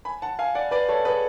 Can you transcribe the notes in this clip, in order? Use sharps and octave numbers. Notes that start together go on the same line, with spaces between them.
G#5 B5
F#5 A5
F5 G#5
D5 F#5
B4 D5
A4 C#5
G#4 B4